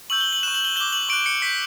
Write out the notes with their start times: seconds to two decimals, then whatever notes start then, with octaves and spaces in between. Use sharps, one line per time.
0.10 C#6 E6 G6 F#7
0.21 G7
0.33 F#7
0.43 C#6 F#6 E7
0.55 F#7
0.65 G7
0.76 D6 G6 G7
0.92 F#7
1.09 C#6 F#6 D7
1.26 C#7
1.42 C#6 G6 B6